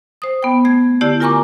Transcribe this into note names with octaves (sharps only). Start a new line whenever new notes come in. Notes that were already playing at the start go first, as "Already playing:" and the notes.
C5 D#6
B3 G5
A3 G#6
D3 A3 E4 G4 D5
F4 A#4 G#5 A#5 C#6 D6